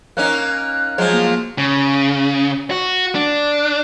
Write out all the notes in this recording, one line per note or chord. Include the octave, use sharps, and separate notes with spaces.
A#3 C#4 D#4 F#6
F3 F#3 G#3
A#3
C#3
F#4
D4